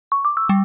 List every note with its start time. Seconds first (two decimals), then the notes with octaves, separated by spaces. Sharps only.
0.12 C#6
0.25 D6
0.37 E6
0.49 G3